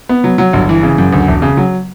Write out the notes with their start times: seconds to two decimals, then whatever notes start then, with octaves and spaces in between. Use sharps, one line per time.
0.09 B3
0.24 F#3
0.38 F#3
0.53 G1
0.69 E3
0.83 C#3
0.98 F#2
1.13 D2
1.28 E1
1.42 C#3
1.57 F#3